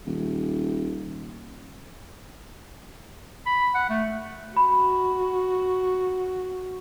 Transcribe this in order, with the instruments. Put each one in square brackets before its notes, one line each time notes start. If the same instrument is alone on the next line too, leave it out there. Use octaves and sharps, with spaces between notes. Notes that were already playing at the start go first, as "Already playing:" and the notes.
[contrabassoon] D#1
[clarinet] B5
F#5
A3
[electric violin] F#4 [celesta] B5